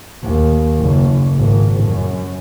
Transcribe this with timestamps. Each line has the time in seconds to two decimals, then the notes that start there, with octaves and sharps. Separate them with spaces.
0.23 D#2
0.80 F#1
1.37 G#1
1.85 F#2